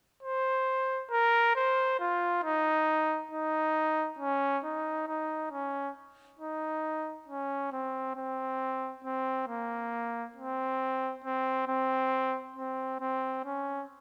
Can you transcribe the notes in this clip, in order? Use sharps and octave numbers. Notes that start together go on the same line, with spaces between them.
C5
A#4
C5
F4
D#4
D#4
C#4
D#4
D#4
C#4
D#4
C#4
C4
C4
C4
A#3
C4
C4
C4
C4
C4
C#4